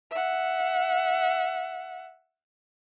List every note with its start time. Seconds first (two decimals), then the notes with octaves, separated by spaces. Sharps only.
0.11 E5 F#5